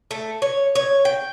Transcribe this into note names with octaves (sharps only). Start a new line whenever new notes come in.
A3
C#5
C#5
G5